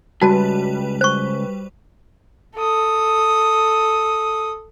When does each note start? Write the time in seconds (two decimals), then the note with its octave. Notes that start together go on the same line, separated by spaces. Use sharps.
0.21 C#2 G3 F#4 B4 A5
1.01 C5 C#6
2.56 A4 D#6